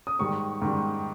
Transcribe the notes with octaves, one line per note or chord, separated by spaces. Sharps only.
D#6
G#2 D#3 G3 C#6
G#2 D#3 G3